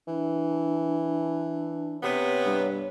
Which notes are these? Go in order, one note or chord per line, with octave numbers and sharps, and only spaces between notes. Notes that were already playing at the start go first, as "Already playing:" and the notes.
E3 D4
C3 B3 C#5
G2